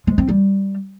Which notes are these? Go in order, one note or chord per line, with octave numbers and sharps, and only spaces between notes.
G#3
C4
G3